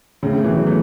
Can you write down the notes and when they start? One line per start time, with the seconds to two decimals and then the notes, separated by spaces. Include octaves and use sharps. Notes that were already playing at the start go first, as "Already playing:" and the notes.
0.23 A2 C#3
0.33 A2 C#3
0.44 B2 E3
0.55 C#3 F#3
0.66 E3 A3